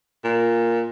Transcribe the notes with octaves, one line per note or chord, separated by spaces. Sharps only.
A#2